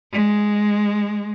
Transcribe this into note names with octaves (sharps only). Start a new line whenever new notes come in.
G#3